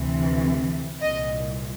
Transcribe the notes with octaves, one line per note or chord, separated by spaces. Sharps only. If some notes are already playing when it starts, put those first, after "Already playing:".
Already playing: D2 C3 E3
C2 A#2 D#5